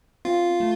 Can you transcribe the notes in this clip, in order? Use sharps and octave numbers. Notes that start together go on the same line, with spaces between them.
C4 F4
A3